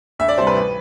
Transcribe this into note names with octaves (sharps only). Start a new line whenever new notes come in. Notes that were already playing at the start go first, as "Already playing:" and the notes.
D2 E5
D5
C3 G3 C5
B4
A1